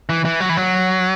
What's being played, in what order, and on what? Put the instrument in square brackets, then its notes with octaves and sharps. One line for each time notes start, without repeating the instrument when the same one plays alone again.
[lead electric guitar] E3
E3
F#3
E3
F#3